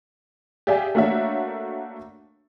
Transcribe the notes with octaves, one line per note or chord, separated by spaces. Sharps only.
G4 G#4 D5 E5 F5 G#5
A3 A#3 D4 F#4 C#5 E5